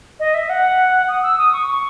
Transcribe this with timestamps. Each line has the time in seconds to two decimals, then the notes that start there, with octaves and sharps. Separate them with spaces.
0.20 D#5
0.34 E5
0.49 F#5
1.08 D#6
1.23 E6
1.38 D#6
1.53 C#6
1.67 C#6